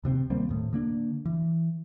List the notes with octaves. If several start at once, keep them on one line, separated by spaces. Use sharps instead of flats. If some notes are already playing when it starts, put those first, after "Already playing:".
D#1 C3 B3 C4
D#2 G3 A#3 C4
D#1 A2
D3 A#3 D4
E3